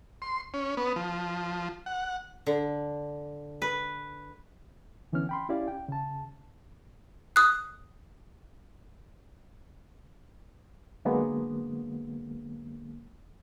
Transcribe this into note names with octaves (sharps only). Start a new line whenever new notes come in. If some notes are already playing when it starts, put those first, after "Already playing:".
C6
C#4
B3
F3
F#5
D3
B4
D3 E3 B3 C#4 F6
G5 B5 C6
C#4 E4 G4 D5 F5
G5
C#3 A5
D#6 F#6
D3 F#3 G#3 A#3 B3